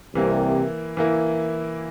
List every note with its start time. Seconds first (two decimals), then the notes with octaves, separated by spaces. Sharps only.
0.15 C2 C3 E3 A#3 E4
0.97 E3 A#3 E4